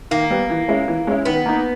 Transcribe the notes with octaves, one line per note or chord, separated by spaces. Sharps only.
D#3 A#3
G3 B3
E3
G#3 C#4 E4
E3
G#3 C#4 E4
D#3 B3
A#3 D#4